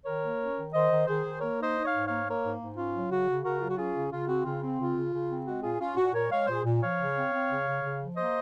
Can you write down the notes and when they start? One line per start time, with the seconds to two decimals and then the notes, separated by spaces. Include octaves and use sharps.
0.05 D#3 A#4 C#5
0.22 A#3
0.39 C#4
0.56 D#3
0.73 D#3 C5 D#5
0.89 D#3
1.06 D#3 G#4 C5
1.23 D#3
1.40 A#3 A#4 C#5
1.57 D#4
1.63 C5 D#5
1.74 D#4
1.85 C#5 F5
1.91 G#2
2.08 A#3 C#5 F5
2.25 A#3
2.30 A#4 C#5
2.41 G#2
2.59 G#2
2.75 C#4 F4
2.92 F#3
3.09 C#3 F#4
3.27 C#3
3.43 C#3 F#4 A#4
3.60 F#3 F4
3.69 F#4
3.77 C#4 F4 G#4
3.94 C#3
4.11 C#3 F4
4.27 C4 F#4
4.44 C#3 F4
4.62 C4
4.78 C#3 F4
4.95 C#3
5.12 C#3
5.29 C4
5.46 G#3 F#4
5.63 A#2 F4 G#4
5.79 C#4 F4
5.96 A#2 F#4
6.13 A#2 A#4 C#5
6.30 G#3 C#5 F5
6.47 A#2 G#4 C5
6.64 A#2
6.81 F3 C#5 F5
6.98 C#3
7.15 C4
7.32 C4
7.49 C#3
7.66 C#3
7.83 C#3
8.00 F3
8.16 A#3 C5 D#5